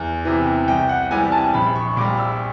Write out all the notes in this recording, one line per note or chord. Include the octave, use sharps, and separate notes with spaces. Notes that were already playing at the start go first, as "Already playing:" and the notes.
Already playing: E2
C3 E3
C2 G5
F#5
C3 E3 G3 G#5
A5
A#1 B5
C#6
A#2 G3 D6
E6